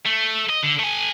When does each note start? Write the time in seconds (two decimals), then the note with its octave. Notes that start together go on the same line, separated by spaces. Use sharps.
0.05 A3
0.49 D#5
0.63 D3
0.79 A3 G#5